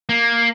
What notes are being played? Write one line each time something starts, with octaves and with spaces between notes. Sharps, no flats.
A#3